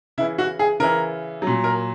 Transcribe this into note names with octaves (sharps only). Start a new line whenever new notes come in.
C#3 E3 E4
F#4
G#4
C#3 E3 A#4
F#3
A#2
A#4